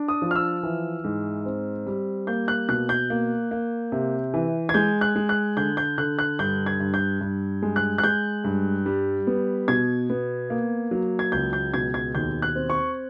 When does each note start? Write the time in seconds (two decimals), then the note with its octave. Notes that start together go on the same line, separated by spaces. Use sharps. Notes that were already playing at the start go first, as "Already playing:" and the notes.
Already playing: D4
0.08 D#6
0.22 F3
0.31 F6
0.36 E6
0.63 E3
1.05 G#2
1.46 C4
1.86 G3
2.27 A#3 G6
2.48 F#6
2.69 B2 F#6
2.89 G6
3.10 A#3
3.51 A#3
3.92 C3
4.34 E3
4.69 G#6
4.74 G#3 G6
5.01 F#6
5.16 G#3
5.29 F#6
5.57 D3 G6
5.77 G6
5.98 D3 F#6
6.19 F#6
6.39 G2 G6
6.66 G#6
6.80 G2
6.94 G6
7.21 G2
7.63 G#3
7.76 F#6
7.98 F#6
8.03 G#3 G6
8.44 G2
8.86 G3
9.27 B3
9.68 B2 G#6
10.10 B3
10.50 A#3
10.91 F#3
11.19 G#6
11.32 C#2 G6
11.53 G6
11.74 B2 G#6
11.94 G#6
12.15 D#2 G6
12.42 F#6
12.55 C4
12.70 C#6